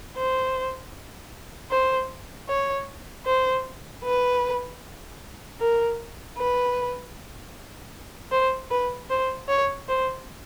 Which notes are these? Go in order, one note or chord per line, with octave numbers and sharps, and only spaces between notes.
C5
C5
C#5
C5
B4
A#4
B4
C5
B4
C5
C#5
C5